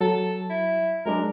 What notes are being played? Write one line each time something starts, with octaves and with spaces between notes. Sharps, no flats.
F#3 A4
E4
F#3 G#3 D4 A#4